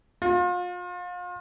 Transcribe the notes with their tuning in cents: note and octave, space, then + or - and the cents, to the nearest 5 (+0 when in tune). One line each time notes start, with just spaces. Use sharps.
F4 +35